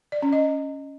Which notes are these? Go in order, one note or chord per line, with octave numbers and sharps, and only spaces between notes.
D5
C#4
D#5